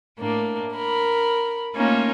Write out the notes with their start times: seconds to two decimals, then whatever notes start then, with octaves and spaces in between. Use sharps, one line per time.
0.19 A2 A#3 D4
0.73 A#4 B5
1.74 A3 A#3 C#4 D#4 F4